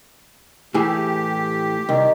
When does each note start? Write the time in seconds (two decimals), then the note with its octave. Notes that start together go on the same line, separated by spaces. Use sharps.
0.74 A2 E3 G4 G#4
1.89 C2 D#3